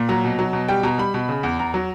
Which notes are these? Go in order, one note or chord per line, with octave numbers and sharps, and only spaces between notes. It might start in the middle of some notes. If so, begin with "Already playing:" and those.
Already playing: A#2
F#3 A#5
B2
F#3
B2
G3 G5
B2 A#5
G3 B5
B2
C#3
E2
E2 A#5
F#3